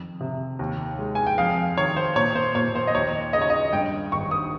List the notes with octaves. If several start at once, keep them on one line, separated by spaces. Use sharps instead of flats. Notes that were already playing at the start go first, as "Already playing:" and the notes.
Already playing: F2 D#3
C3
D#2
G#3
G#5
G5
F2 F5
D#3 C#5
C5
A#2 C#5
C5
A#2 C#5
C5
D#5
D#2 C#5
C#3 D#5
C#5
D#5
G2 G5
G#1 C#6
D#6